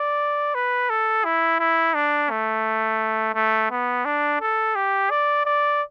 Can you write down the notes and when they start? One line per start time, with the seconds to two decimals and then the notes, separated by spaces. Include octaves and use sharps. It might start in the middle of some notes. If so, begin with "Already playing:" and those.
Already playing: D5
0.54 B4
0.90 A4
1.25 E4
1.60 E4
1.94 D4
2.30 A3
3.35 A3
3.71 B3
4.05 D4
4.41 A4
4.75 G4
5.10 D5
5.45 D5